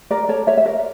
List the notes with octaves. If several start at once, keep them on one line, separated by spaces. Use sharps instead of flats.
A#4 D5
A4 C#5
C#5 E5
E5
A#4 D5